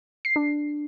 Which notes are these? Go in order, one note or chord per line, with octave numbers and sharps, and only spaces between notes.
C7
D4